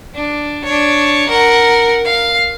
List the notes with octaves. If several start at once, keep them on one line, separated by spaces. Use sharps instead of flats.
D4
D4 C#5
A#4 F#5
F5